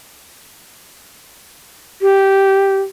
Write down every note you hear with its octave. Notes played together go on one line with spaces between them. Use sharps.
G4